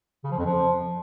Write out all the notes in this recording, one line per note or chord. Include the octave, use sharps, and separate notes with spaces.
C#3
F3
F2
F3